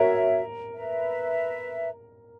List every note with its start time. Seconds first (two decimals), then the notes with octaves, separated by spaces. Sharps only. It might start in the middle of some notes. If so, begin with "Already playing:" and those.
Already playing: F#4 A#4 C#5 E5
0.72 B4 E5 A#5